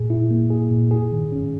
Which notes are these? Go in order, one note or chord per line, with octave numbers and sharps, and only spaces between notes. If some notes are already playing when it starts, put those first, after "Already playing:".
Already playing: A#2 G#4
E4
A#3
G#4
A#2
G#4
D#3
C#4